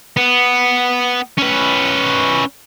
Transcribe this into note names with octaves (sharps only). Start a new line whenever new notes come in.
B3
C#4 B4